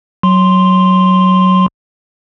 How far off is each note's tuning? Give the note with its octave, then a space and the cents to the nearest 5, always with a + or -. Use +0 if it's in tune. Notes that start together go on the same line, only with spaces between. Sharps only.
F#3 +5 C6 +0